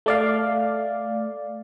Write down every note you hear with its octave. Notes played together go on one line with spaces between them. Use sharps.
A3 D5 F5